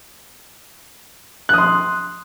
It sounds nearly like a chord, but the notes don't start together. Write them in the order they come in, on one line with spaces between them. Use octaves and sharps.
F#6 D#6 C6